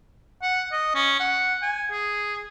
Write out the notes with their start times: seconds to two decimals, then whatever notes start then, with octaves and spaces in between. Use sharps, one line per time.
0.42 F#5
0.72 D#5
0.95 C#4
1.20 F#5
1.62 G#5
1.91 G#4